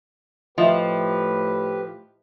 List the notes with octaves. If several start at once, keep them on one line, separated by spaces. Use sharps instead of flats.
A2 F3 G4 B4 D#5 E5